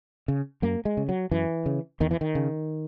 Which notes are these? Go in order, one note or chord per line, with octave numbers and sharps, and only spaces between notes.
C#3
F#2 A#3
G#3
C#3
F#3
F#2 E3
C#3
E2 D#3
E3
D#3
C#3